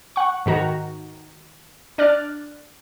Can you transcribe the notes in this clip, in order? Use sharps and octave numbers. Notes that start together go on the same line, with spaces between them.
F#5 C#6
G#2 D#3 F#4 A#5
D4 D5 F6 F#6 A6